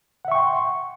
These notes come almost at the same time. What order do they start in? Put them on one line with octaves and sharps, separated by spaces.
F#5 E5 C#6 G5 C6